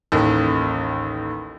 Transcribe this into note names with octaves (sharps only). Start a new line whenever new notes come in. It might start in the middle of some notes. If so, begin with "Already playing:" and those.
A1 D#2